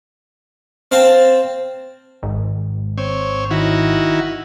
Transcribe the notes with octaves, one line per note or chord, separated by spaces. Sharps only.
C4 F5 A5
G#1
C4 C#5
D#3 E4 F#4